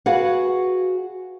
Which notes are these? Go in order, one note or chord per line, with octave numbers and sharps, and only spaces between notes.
F#4 G#4 B4 F5 F#5